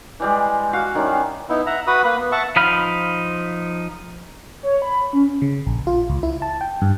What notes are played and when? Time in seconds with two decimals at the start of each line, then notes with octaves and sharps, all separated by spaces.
0.20 E3 G3 G#3
0.73 F#4 F5
0.95 D#3 G3 C#4 E4
1.49 B3 D#4 E4
1.66 E5 F#5 A#5
1.87 F#4 B4 B5 D#6
2.05 A#3 B4 B5
2.18 B3
2.32 E5 F#5 A5 C#6
2.56 F3 D#4 F5 B5 F6
4.63 C#5
4.82 B5
5.13 C#4
5.42 C#3
5.66 A#1
5.87 F4
6.09 C#2
6.23 E4
6.42 A5
6.61 G5
6.82 G2